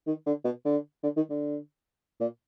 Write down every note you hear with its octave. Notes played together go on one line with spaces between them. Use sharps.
D#3
D3
B2
D3
D3
D#3
D3
A#2